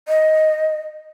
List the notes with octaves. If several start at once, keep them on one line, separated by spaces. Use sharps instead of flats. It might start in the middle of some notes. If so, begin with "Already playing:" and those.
D#5